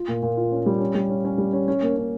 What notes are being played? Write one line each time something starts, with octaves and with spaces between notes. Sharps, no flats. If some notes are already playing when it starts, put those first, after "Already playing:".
Already playing: F4
A#2
A#2
F4
C#4
G3
C#4
G3
C#4
C#4
G3
C#4
C#4
A#3
C#4